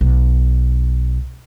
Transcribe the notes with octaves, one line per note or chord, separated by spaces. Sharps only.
B1